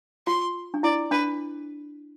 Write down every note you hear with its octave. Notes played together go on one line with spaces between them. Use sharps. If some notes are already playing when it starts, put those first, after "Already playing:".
F4 C6
D4
E4 D5
D4 B4